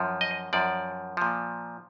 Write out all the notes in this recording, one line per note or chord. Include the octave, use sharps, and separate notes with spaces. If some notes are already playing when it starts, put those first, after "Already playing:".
Already playing: F#2 F3
D#5
F#2 F3 D5
A#2 F3